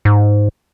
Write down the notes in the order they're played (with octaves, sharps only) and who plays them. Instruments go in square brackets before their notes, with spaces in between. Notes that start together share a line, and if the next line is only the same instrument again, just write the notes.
[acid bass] G#2